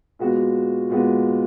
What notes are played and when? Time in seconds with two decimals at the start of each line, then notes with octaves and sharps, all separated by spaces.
0.19 A#2 G#3 B3 F#4
0.90 A#2 G#3 B3 F#4